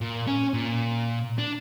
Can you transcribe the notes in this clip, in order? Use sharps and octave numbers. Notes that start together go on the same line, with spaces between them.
A#2
C#4
A#2
D4